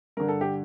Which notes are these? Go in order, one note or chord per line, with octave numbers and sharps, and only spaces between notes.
G2 D3 A#4
A4
G4